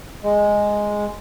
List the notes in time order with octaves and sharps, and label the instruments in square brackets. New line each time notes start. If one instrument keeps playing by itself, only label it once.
[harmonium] G#3